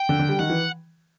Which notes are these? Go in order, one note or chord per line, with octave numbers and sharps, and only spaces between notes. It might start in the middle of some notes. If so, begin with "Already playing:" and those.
Already playing: G5
D3
D3
G3
D#3 F#5
E3